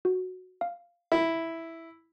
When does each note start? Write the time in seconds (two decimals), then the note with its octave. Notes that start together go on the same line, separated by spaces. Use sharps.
0.05 F#4
0.61 F5
1.12 E4